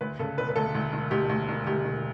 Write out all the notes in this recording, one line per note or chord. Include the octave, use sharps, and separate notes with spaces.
D2 B4
C#3 A4
E1 B4
B4
D2 A4
D2
E1
D2 G4
D2
E1
D2 G4
E1